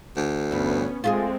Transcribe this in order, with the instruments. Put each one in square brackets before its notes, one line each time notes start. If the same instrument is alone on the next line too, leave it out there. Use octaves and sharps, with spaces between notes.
[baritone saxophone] D2
[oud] E2 G2 [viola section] B3 C#4
[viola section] G#3 A3 C4 [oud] F4 G4 G#4